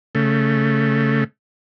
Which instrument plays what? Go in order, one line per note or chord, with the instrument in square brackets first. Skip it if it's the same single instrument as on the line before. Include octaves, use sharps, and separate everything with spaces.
[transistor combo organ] C#3 A3